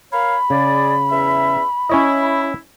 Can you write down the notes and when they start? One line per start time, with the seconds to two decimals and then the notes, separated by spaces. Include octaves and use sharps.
0.12 A#4 C#5 F5 B5
0.50 C#3 G#4 D5
1.10 E2 C#4 E5
1.89 C#4 E4 C#5 D#5